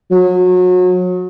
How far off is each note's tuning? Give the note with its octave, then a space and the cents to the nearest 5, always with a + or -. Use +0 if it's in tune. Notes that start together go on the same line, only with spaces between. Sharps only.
F#3 -30